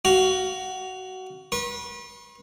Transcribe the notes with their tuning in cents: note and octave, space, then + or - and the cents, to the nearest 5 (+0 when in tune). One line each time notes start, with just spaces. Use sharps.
F#4 +20 F5 -5
B4 -30 C6 +45